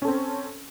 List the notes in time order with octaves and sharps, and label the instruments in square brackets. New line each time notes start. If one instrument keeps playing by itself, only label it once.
[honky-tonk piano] C#4
A4
C4